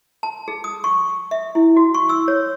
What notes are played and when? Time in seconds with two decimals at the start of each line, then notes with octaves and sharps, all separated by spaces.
0.23 A5
0.48 G#4
0.64 D#6
0.84 C#6
1.31 E5
1.55 E4
1.77 F#4
1.94 C#6
2.09 E6
2.28 C#5